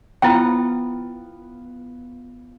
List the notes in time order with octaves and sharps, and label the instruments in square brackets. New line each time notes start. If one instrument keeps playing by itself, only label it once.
[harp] B3 F4 [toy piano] E4 G5